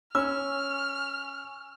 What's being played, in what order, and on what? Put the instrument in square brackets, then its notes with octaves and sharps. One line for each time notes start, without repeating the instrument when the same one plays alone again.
[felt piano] C#4 [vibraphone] G#5 C#6 [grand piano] E6 [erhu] F6